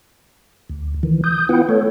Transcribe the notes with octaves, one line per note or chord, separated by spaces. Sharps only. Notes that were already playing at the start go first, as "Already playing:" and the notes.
D2
D#3 E3
D#6 G6
B3 E4 F4 B4 F#5 G5
A3 A4 C#5